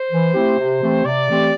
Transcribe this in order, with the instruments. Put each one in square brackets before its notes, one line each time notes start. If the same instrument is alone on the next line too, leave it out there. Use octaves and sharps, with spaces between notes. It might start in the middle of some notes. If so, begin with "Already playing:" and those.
Already playing: [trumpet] C5
[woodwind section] E3
A3 C4 E4 G4
C3
E3 A3 C4 G4
[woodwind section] C3 [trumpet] D5
[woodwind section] E3 A3 C4 G4